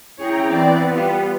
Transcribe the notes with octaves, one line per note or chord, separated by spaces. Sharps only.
C#4 E4 G#4 C#5 G5 A#5
E3 B3 C4 D5
G3 F4